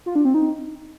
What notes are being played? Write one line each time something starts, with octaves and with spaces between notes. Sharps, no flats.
F4
D4
C4
D#4